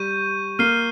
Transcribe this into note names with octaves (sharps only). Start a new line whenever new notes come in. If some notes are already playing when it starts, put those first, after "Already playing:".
Already playing: G3 C#6 G6 D#7
A#3 F6 C7 D#7 G7